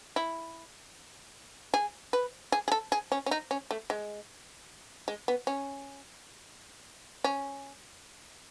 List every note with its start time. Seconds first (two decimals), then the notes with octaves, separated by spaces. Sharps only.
0.16 E4
1.74 G#4
2.13 B4
2.52 G#4
2.68 G#4
2.72 A4
2.92 G#4
3.12 C#4
3.26 C#4
3.31 D#4
3.51 C#4
3.71 A3
3.90 G#3
5.08 G#3
5.28 B3
5.47 C#4
7.24 C#4